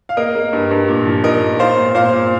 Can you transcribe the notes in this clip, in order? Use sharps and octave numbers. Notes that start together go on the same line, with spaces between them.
F5
A#3 A#4 D#5
A#3
G2
G2
A#2
F3
D#4 A#4 D#5
A#2
F4 C5 F5
A#2
A#2 C5 F5
A#2